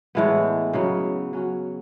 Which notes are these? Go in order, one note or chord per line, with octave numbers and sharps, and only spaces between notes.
A2 E3 G#3 B3
C#3 F#3 B3
F#3 C#4 F#4